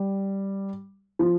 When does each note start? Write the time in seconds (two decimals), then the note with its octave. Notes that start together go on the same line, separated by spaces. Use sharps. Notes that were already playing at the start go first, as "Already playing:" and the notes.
Already playing: G3
1.19 F3